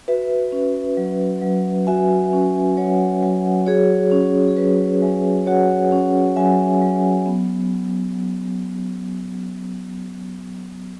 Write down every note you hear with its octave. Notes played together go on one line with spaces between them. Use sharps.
F#4 B4 E5
C#4
F#3
F#3
F#4 E5 G#5
C#4
F#3 C#5 F#5
F#3
F#4 G#4 C#5
C#4
G#4
F#3 F#4 B4
F#3 E5 G#5
F#4 C#5 F#5
C#4
F#3 E5 G#5
F#3
B3